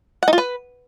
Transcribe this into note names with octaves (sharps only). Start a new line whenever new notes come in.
F#5
D#4
F4
B4